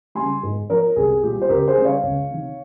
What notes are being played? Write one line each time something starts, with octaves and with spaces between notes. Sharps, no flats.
C#3 G3 G#5 C6
G#2
F3 A#4 C#5
C2 G#4
A#2 G3 G4
C5
C#2 G4 A#4
G#4 C5
C#3 G3
C#5 F5
C#2
C3 D#3